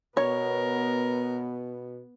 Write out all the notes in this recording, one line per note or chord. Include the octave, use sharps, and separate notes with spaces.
B2 B3 A#4 C#5